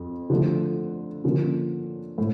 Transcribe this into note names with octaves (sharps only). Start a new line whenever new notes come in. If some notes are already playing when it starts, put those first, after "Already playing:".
Already playing: F2 F3
D3 F3 A3
D3 F3 A#3 C#4
A2